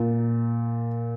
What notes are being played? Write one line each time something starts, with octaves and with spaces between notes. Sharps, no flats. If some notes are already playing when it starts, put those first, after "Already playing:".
Already playing: A#2